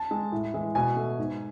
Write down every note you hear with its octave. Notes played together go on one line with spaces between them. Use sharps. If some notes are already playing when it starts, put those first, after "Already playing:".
Already playing: A5
G#3
A2
E3 G#3
B2 G#5
A3
G#2